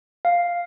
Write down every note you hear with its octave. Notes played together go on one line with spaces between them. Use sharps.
F5